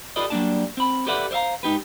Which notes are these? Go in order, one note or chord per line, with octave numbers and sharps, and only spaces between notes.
F4 G4 A4 B4 D5 D#5
F#3 G3 A#3 D4 D5 A5
C4 B5
G4 A4 B4 D5 E5 F#5
C5 D5 E5 F5 A#5
G#2 D#4 G4 B4